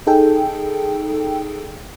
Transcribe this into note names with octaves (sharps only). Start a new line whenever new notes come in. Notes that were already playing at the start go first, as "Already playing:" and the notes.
D#4 G#4 A4 G5